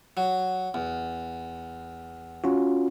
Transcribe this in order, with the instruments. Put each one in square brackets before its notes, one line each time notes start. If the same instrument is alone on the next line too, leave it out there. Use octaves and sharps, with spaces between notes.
[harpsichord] F#3
E2
[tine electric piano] C#4 F4 F#4